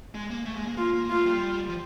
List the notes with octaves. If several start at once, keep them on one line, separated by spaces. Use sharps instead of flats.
G#3
A#3
A3
G#3
A#3
A#3 F4
A#3
A#3
A3 F4
G3
F3